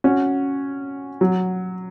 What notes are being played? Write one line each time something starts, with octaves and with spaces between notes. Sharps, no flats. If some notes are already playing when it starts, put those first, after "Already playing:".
C#4 F#4
F#3